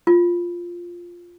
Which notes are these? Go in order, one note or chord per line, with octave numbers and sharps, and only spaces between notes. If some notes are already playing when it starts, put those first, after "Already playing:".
F4